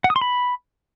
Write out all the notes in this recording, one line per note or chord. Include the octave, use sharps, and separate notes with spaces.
F#5
D#6
C6
B5